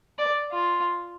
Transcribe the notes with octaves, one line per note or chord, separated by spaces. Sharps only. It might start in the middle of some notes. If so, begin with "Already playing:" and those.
D5
F4